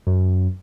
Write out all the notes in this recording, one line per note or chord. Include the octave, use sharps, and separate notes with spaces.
F#2